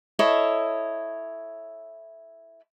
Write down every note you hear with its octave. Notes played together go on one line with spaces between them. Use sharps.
E4 A4 C#5 D#5